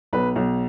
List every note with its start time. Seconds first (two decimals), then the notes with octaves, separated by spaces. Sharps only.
0.13 B1 B4
0.36 B1